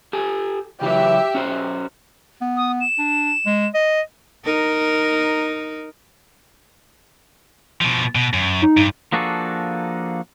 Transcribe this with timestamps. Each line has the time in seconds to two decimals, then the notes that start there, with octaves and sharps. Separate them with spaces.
0.13 G4 A4 G#5
0.81 C#3 E3 F#3 G4 E5
1.35 C#4 F#4 C5
2.41 B3
2.56 D#6
2.81 E7
2.99 D4
3.46 G#3
3.74 D#5
4.45 D#4 A#4
7.81 B2 F3
8.15 B2
8.34 F#2
8.62 D#4
8.77 G2
9.13 F3 A#3 D4 F#4 G#4 A4